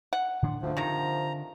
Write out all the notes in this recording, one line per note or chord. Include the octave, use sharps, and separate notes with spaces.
F#5
A2 D3 D4
D2 D3 F3
C3 D#3 A#5